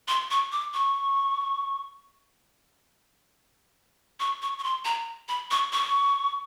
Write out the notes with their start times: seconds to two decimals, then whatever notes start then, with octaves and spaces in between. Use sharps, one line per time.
0.08 C6
0.31 C#6
0.52 D6
0.74 C#6
4.20 C#6
4.42 C#6
4.59 C#6
4.64 C6
4.85 A#5
5.28 B5
5.51 C#6
5.73 C#6